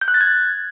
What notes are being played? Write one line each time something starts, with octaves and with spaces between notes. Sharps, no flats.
G6
F#6
A6
G#6